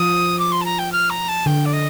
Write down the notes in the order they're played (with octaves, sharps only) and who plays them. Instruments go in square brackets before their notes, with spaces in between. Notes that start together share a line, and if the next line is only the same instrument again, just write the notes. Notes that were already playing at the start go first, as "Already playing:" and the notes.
Already playing: [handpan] F3 [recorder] D#6
[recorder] D6
C6
A5
A#5
G5
F6
A#5
A5
[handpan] D3 [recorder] G5
[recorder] D5
D#5